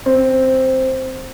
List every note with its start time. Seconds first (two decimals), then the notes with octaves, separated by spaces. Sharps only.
0.06 C4